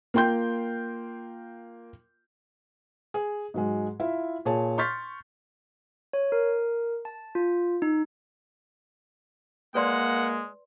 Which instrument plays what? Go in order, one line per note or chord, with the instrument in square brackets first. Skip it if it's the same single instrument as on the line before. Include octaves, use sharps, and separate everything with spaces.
[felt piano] A#3 F4 G5 C6 G6
G#4
G#2 F#3 G#3
E4 F4 E5
A#2 G#4 C#5 A5
C6 C#6 F6 G6 A6 B6
[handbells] C#5
A#4
A5
F4
D#4
[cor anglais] G#3 [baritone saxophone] A#3 [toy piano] B4 D5 C6 [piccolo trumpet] F#5